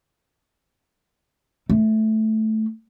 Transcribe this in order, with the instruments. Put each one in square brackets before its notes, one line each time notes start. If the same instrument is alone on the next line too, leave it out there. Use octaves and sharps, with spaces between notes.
[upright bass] A3